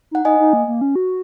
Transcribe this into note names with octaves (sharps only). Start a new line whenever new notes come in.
D#4 F#5
D#4 D#5 G#5
D#4
A#3
A#3
C#4
F#4